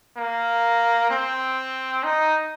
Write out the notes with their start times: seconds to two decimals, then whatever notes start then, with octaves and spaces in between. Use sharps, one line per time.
0.17 A#3
1.10 C4
2.04 D#4